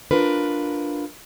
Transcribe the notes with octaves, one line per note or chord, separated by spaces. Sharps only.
D4 F4 A#4 B4